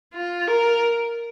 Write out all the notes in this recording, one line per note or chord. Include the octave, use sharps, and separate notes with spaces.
F4
A#4